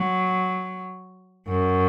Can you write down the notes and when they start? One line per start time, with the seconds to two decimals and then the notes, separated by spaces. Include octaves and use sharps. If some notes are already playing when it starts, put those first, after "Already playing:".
Already playing: F#3
1.48 F#2